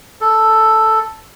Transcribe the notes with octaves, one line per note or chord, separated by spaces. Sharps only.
A4